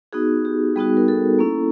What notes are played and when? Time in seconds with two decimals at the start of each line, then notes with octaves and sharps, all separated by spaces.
0.13 B3 D#4 F#4 G#4
0.45 G4
0.76 G3 B3 D#4 F#4 G#4
0.97 A#4
1.08 A4
1.39 A#3 C#4 E4